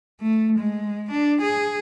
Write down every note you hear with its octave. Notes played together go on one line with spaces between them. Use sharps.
A3
G#3
D4
G#4